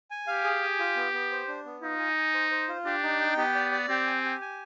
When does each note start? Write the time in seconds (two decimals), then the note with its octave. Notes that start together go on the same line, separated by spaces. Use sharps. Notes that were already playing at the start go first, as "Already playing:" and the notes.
0.11 G#5
0.27 G4 F5
0.44 G#4
0.62 G#5
0.79 F4
0.96 B3
1.13 B3
1.31 C5
1.48 D4
1.65 B3
1.82 D#4 F4
1.99 G#5
2.17 G#5
2.34 C5
2.51 C5
2.69 F4
2.85 D4 G4
3.04 D#4
3.21 G5
3.37 B3 G4
3.55 D5
3.72 D5
3.88 C4 G4
4.06 G#5
4.24 G4
4.41 G#5